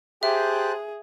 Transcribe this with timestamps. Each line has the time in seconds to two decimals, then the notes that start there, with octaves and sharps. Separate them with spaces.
0.23 G4 G#4 C5 E5 A5 F#6